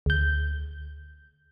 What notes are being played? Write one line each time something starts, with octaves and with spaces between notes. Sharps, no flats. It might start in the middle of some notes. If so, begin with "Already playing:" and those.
D2 G6